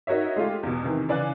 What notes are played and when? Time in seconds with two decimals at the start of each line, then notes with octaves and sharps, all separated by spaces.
0.07 D#4 F#4 A#4 C#5 E5
0.36 G#3 A3 F4 G4
0.63 E2 B2
0.84 C3 D#3 E3
1.09 C#3 E3 D5 G#5 F#6